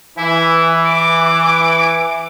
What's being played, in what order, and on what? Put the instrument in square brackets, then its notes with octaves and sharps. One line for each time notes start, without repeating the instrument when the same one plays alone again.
[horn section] E3 [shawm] E4
[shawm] D6